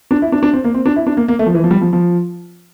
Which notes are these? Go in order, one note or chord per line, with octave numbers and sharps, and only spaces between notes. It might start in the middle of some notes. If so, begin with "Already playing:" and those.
D4
E4
D4
D4
C4
A#3
C4
D4
E4
D4
A#3
A#3
A3
F3
E3
F3
G3
F3
F3